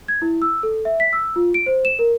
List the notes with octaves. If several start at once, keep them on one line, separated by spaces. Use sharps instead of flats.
G#6
E4
E6
A4
E5
B6
E6
F4
D7
C5
E7
A#4